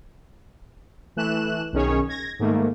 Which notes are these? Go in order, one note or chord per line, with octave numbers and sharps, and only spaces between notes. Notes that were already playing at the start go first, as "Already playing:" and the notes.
E3 A3 F#6 E7
B1 D#3 C#4 G#4 C#5
G#6 A#6
G#2 D#3 A3 A#3